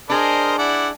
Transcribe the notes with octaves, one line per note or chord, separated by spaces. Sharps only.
D4 G#4 A#4 C5 D#5
E4 D5 F#5